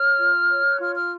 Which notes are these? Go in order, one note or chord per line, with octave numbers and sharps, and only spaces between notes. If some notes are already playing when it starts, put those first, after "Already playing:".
Already playing: C#5 F6
F4
C#5
F#6
F4 F6
F6